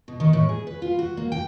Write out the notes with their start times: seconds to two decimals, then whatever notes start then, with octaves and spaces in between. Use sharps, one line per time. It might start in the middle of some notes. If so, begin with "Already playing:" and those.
0.08 B2
0.20 D#3
0.33 A2
0.49 G#4
0.67 B4
0.82 F4
0.99 F#4
1.17 A#3
1.32 G5